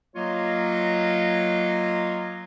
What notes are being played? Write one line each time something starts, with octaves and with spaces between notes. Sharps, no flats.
F#3 A#3 F4 C#5 D#5